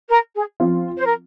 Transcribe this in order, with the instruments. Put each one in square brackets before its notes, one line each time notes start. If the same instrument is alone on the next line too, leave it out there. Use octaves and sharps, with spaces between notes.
[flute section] A#4
G#4
[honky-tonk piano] F3 C4 F4
[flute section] C5
A#4